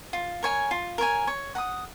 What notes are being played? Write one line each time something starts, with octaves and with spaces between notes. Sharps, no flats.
F4
A#4 C#5 G#5
F4
A#4 C#5 G#5
C#5
F#5 A#5 D#6